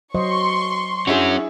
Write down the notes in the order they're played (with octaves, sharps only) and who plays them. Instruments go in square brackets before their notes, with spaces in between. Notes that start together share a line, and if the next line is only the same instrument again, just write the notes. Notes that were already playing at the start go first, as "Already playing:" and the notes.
[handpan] F#3 C5 D#5 [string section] C6 C#6
[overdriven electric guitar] C#4 F#4 [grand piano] D4 E4 G#4